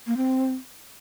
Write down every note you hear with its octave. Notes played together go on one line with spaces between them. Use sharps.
A#3
C4